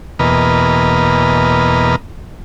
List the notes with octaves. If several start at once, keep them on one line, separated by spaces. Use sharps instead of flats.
E2 B2 A#3 B4 D#5 F6